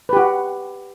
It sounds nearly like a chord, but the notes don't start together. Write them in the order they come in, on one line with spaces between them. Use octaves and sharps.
B4 G4 F#4